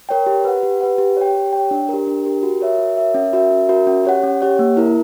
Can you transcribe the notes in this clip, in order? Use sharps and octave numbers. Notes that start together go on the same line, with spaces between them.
A#4 C#5 G5
G4
B4 F#5
G4
B4 F#5
G4
C#5 G5
G4
C#5 G5
D4
G4 A#4
D4
G4 A#4
F#4
A#4 C#5 E5
F#4
A#4 C#5 E5
C#4
F#4 A#4 E5
C#4
F#4 A#4 E5
C#4
G4 C#5 F#5
C#4
G4 C#5 F#5
A#3
E4 A#4